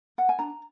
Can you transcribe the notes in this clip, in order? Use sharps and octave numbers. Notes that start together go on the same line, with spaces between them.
F#5
G#5
D4 A#5